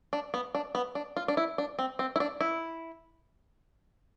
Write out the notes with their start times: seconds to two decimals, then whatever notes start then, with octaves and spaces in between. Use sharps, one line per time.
0.13 D4
0.34 B3
0.55 D4
0.75 B3
0.95 D4
1.17 F4
1.28 D4
1.37 E4
1.58 D4
1.79 C4
1.99 C4
2.16 E4
2.20 D4
2.41 E4